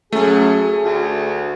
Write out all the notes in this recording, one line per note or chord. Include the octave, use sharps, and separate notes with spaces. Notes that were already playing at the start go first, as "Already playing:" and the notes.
F#2 A3 G#4
D2